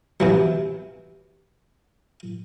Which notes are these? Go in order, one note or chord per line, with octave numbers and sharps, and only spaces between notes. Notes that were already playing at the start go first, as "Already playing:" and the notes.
C3 E3 F#3